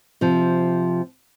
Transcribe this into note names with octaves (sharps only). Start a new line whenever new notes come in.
C3 F3